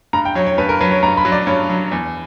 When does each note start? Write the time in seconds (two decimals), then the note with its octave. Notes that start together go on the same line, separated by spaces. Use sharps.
0.13 G2 A#5
0.25 G5
0.35 F#3 C#5
0.46 C#5
0.58 G2 B4
0.69 A#4
0.81 F#3 B4
0.91 C#5
1.03 G2 A#5
1.17 B5
1.25 F#3
1.32 D5
1.47 G2 C#5
1.69 F#3
1.92 E2